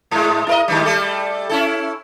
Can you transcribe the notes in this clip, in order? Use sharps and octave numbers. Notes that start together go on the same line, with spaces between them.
G#2 G#3
E4 A#4 D#5
G#2 D#3 G3
G3 A3 A4
C#4 E4 A4